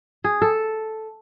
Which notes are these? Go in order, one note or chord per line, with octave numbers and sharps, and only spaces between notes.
G#4
A4